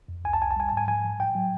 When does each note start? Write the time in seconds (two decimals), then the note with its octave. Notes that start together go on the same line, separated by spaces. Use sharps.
0.08 F2
0.24 C2 G#5
0.33 A5
0.40 C2 G#5
0.51 A5
0.56 G3 G#5
0.69 A5
0.73 G#2 G#5
0.87 F3 G#5
1.04 F3
1.20 A2 G5
1.35 F#3